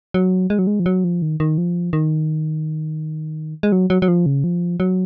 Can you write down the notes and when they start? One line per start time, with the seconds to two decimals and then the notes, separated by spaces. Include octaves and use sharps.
0.14 F#3
0.50 G#3
0.59 F#3
0.67 G#3
0.80 F3
0.86 F#3
1.04 F3
1.22 D#3
1.40 D#3
1.58 F3
1.93 D#3
3.63 G#3
3.72 F#3
3.90 F#3
4.02 F#3
4.08 F3
4.26 C#3
4.44 F3
4.80 F#3